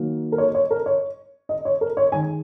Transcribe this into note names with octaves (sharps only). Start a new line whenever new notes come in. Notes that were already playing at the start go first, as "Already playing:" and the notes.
Already playing: D#3 F#3 A#3
A#4
C#5
C#5
A#4
C#5
D#5
C#5
A#4
C#5
D#3 G#3 G#5